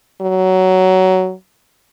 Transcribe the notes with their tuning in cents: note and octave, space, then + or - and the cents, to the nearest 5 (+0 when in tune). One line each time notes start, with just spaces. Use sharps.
F#3 +15